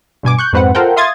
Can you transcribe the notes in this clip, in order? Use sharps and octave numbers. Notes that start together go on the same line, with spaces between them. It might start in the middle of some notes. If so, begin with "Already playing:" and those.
G2 B2 G#5 D6
C#6 F#6 G6
F2 G#2 C4 B4 C5 F#5
F4 A4 A#4 C5 F#5 G5
E5 F5 C6 D#6 G#6 A6